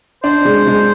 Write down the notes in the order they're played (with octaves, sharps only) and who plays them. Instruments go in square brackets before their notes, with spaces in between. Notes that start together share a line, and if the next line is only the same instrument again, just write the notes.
[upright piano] D4 [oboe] C5
[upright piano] G#3
G#3